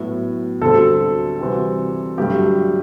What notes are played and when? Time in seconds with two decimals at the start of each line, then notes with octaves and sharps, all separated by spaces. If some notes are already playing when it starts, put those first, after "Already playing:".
Already playing: A2 F#3 B3 E4
0.61 D2 D3 G3 C4 F#4 A4
1.39 C3 E3 G3 C4 F#4
2.18 G2 D3 F#3 A3 G4